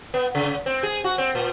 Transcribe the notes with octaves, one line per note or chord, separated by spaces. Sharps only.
B3
C#3
C4
G#4
F#4
C4
A#2